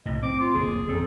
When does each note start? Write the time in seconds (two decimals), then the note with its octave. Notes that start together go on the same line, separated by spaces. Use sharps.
0.06 C2 A2 D#5
0.23 C4 D6
0.40 F4
0.54 F#1 D2 A#3 G#4
0.89 E2 C4 A4